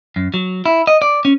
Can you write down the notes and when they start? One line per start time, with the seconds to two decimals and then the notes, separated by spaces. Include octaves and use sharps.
0.16 F#2
0.34 F#3
0.66 E4
0.87 D#5
1.02 D5
1.25 C#4